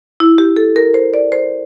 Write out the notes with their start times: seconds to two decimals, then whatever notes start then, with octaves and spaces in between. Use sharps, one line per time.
0.20 E4
0.38 G4
0.56 A4
0.76 A#4
0.94 C5
1.14 D5
1.32 C5